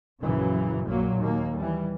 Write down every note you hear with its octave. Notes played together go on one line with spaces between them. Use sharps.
A#1 F#2 C#3 E3 F#3
A#1 A#2 F#3 A#3
D#2 A#3
E3 G3